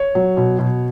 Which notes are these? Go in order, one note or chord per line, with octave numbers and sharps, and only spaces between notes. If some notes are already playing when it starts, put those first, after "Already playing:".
Already playing: C#5
F#3
B2
B2